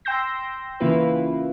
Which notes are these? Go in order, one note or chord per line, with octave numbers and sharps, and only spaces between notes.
G5 C6 E6 G6 A#6
C#3 E3 A#3 E4 F4 B4